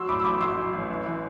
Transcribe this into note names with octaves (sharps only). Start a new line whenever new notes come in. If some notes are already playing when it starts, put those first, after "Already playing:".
Already playing: F#3 C6 E6
A2 B5 D6
E6
A1 B5 D6
F#3 C6 E6
F#3
A1
E3
E3